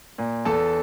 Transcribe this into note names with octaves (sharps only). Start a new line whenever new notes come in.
A#2
E2 A4 A5